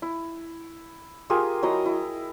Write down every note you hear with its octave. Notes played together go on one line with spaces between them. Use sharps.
E4
F4 G4 G#4 A#4
F#3 E4 D#5 A#5
E4